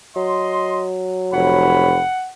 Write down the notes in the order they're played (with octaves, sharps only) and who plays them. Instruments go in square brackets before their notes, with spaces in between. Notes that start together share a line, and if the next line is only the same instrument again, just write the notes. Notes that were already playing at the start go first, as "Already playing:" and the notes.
[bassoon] F#3 [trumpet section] D#5 C6
[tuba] F1 [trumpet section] C#5 B5 [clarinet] F#5